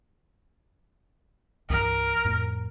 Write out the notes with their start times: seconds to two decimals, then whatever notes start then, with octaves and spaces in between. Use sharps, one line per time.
1.70 C2 G2 E3 A#4
2.25 F2 A2